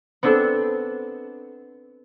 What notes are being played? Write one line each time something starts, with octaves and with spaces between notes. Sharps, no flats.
B3 C4 D4 A4